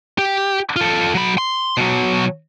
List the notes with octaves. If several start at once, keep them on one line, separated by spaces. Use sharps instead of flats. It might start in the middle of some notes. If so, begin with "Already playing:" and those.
G4
F4 A4
F#3 B5
C6
B2 F#3